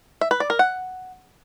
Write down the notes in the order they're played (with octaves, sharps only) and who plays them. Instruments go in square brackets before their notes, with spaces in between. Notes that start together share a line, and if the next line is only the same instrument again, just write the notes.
[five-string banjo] E5
B4
D5
A#4
F#5